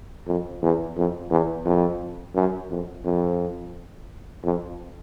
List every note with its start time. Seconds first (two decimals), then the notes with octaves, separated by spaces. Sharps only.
0.27 F2
0.62 E2
0.97 F2
1.31 E2
1.65 F2
2.35 F#2
2.70 F2
3.05 F2
4.44 F2